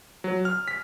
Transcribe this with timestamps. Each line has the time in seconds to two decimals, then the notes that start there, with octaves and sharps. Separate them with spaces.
0.24 F#3
0.45 F6
0.68 B6